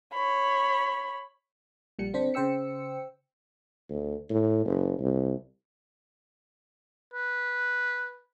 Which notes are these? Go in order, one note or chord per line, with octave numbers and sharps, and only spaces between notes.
C#5 B5
A#1 A#2 G3 C#7
D3 C4 D4 C5 B6
C#3 C5 G5 E6 C#7
D2
A2
F#1
C2
B4